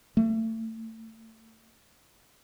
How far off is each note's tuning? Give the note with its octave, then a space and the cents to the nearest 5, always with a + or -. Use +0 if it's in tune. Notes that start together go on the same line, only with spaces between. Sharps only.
A3 +30